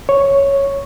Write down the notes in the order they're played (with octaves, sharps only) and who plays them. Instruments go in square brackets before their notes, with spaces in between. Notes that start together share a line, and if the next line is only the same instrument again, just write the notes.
[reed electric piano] C#5